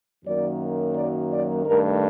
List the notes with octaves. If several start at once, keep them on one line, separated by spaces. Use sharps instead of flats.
F#2 D#3 F#3 A#3 D5
D5
D5
G2 D#3 A3 A#4